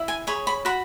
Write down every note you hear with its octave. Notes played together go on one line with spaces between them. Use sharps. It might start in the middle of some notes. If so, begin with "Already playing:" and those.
Already playing: E4
G#5
G#4 C#5 B5
B5
F#4 B5